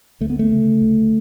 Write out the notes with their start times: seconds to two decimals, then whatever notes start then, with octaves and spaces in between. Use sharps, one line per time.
0.21 D2 A3
0.30 B3
0.39 A3
0.51 C#3
0.82 D2